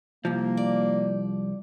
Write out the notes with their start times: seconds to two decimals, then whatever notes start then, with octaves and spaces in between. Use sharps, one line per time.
0.25 C2 F3 A#3
0.57 D5